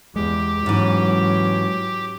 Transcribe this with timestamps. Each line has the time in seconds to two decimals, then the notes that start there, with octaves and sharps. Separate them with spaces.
0.16 E2 G#3 G4
0.66 G#2 E3 F#3 C#4